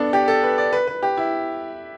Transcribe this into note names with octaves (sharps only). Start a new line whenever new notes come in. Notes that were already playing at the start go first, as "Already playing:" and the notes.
Already playing: B3 D4 A4
G4
A4
B4
D5
B4
B4
G4
E4